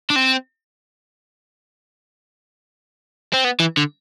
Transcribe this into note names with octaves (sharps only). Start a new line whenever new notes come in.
D4
C4
C4
B3
E3
D3